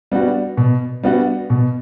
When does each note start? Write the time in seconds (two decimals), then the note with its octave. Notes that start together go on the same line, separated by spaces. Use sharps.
0.12 G3 B3 D4 F#4
0.57 B2
1.03 G3 B3 D4 F#4
1.50 B2